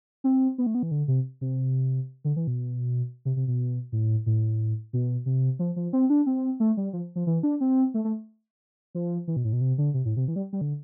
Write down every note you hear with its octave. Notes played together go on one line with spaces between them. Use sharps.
C4
B3
A3
B3
E3
D3
C3
C3
D3
E3
B2
C3
C3
B2
A2
A2
B2
C3
F3
F3
C4
D4
C4
A3
G3
F3
F3
E3
D4
C4
A3
A3
F3
E3
B2
A2
B2
C3
D3
C3
A2
C3
E3
G3
G3
D3